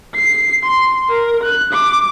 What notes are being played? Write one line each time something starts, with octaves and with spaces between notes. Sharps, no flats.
C7
C6
A#4
F#6
D6